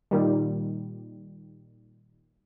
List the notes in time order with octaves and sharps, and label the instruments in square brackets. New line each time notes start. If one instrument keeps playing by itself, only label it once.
[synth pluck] A#2 D#3 G3